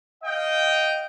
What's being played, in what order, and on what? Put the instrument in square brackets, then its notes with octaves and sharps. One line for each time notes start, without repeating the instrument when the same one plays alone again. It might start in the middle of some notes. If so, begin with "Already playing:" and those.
[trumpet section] D#5 F5 G5